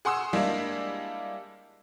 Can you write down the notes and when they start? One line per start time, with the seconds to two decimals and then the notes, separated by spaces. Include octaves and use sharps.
0.05 G#4 F#5 C6 D#6 E6
0.33 G3 G#3 A#3 D4 E4 F4